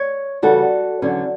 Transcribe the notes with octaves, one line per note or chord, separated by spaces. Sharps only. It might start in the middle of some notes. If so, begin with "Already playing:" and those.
Already playing: C#5
E2 C#3 G3 F#4 A4
E2 D3 F#3 C#4